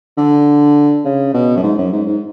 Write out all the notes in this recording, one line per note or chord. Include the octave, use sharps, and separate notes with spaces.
D3
C#3
B2
F#2
G#2
F#2
G#2
G#2